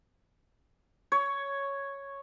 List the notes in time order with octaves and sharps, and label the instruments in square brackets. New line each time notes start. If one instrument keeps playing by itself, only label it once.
[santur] C#5